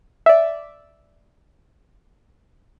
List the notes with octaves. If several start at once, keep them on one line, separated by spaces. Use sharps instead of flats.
D5 E5